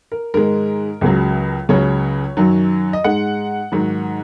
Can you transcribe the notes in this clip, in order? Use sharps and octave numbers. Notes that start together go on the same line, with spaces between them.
A#4
G#2 D#3 G#3 A#4
C#2 C#3 F#3
C#2 C#3 F#3 C#5
F#2 D#3 F#3
D#5
G#2 G#3 F#5
G#2 D#3 F#3